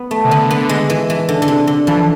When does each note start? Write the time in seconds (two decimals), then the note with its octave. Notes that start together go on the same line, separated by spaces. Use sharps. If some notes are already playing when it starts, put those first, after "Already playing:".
Already playing: B3
0.11 A3
0.25 C3
0.31 D3 B3
0.51 B3
0.69 G#3
0.90 E3
1.10 E3
1.29 D3
1.42 D3
1.48 C3
1.67 D3
1.87 E3 F3